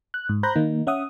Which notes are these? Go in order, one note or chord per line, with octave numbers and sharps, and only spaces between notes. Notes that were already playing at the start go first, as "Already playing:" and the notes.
F#6
G#2
C5 A#5 B5 F#6 G6 A#6
D#3 A#3 D#4
C#4 E5 F#5 D#6